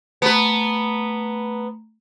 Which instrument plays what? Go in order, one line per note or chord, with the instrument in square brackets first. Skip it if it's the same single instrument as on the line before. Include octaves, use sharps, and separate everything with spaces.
[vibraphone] A3 A#5 B5 [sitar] B3 B4